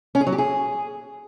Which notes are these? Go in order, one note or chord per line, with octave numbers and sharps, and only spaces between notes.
C#4
G#4
F#3
G4
G#4